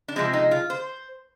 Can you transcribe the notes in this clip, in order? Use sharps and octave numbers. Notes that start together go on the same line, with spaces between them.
D4
C3 F3 G#3 C4
D#4
F4
C5